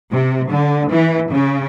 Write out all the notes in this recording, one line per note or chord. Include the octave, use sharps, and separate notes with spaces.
C3
D3
E3
C#3